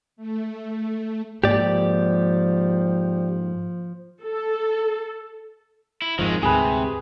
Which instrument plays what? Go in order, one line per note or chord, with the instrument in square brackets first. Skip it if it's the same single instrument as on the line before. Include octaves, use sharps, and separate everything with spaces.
[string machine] A3
[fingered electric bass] G#2 A#3 [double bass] F3 [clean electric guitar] G4 D5
[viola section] A4
[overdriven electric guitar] E4
[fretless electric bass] F2 G#2 F3 [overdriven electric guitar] D#3 G#3
[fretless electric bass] D2 G#2 [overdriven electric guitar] C3 [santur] G#4 B4